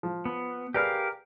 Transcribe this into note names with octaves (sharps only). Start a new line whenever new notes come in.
F3
B3
G4 G#4 A#4 B4 D5 F5